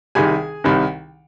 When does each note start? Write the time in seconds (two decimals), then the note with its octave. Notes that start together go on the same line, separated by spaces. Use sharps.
0.15 C2 C3 D#3 G#4 G#5
0.64 C2 C3 D#3